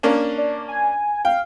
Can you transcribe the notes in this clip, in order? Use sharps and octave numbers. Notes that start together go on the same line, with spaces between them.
A#3 C#4 D4
D5
G#5
F5 G5